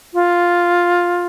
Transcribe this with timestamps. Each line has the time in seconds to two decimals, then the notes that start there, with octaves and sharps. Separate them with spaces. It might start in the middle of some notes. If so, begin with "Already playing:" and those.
0.13 F4